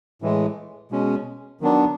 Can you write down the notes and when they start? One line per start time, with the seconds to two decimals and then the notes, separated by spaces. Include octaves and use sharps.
0.22 A2 E3 G#3
0.91 B2 G#3 C#4
1.61 D#3 F#3 B3 D4